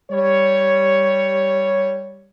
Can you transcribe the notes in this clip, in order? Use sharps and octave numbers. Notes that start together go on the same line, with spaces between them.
G3 C#5